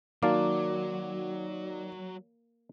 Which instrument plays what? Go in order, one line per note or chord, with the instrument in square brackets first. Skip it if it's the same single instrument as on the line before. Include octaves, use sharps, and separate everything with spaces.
[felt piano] D#3 [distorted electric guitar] F#3 [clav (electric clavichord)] A#3 F5 A5 [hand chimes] F#4 D5 D6